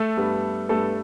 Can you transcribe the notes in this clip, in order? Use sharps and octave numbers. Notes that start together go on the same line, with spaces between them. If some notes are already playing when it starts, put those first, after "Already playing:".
Already playing: A3 A4
G2 G3 B3
G2 G3 A3 B3 A4